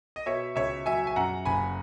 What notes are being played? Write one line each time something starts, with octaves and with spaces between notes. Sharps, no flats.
D#5
B2 C#5 E5
C#2 C#5 E5
F#3 E5 G#5
G#5
F#2 F#5 A#5
F#1 G#5 B5